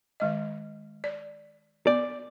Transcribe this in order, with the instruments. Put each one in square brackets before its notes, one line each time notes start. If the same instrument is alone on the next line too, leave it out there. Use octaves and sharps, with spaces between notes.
[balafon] D#3 G#3 D#5
D5
[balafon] B3 [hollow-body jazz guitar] D5